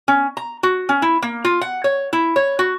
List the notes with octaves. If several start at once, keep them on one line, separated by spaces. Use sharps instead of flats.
C#4
A#5
F#4
C#4
E4
A#3
F4
F#5
C#5
E4
C#5
F#4